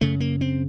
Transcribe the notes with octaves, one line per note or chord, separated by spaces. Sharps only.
F#2 C#3 A3
A#3
C4